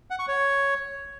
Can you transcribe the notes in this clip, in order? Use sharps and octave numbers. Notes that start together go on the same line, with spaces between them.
F#5
C#6
C#5